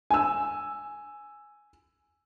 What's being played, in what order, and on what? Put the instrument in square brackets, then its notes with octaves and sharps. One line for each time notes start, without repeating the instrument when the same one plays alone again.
[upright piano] G#5 E6